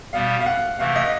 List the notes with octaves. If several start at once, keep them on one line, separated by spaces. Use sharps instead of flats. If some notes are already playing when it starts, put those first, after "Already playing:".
B2 G3 B3 F5
F5
F#5
C3 E3 A3 F5
D#5